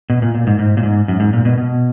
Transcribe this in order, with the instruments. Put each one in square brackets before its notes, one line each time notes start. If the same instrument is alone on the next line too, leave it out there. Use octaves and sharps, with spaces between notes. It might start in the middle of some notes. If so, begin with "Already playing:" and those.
[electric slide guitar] B2
A#2
A#2
G#2
G#2
A#2
G#2
F#2
G#2
A#2
B2
B2